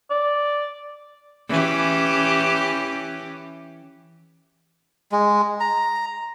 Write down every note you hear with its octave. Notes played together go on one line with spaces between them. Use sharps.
D5
E3 C#4 G4
G#3
A#5